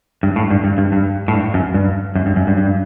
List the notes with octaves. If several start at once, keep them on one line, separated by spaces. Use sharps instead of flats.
G2
A2
G2
G2
G2
G2
A2
G2
F#2
G2
F#2
G2
F#2
G2
G2